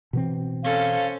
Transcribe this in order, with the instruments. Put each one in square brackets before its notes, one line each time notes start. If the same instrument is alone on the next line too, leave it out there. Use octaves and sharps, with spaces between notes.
[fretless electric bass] B2 E3 C4
[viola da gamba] C#4 A4 C5 [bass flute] F5